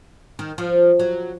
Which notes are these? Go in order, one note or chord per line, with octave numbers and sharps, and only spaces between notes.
D#3
F3
F#3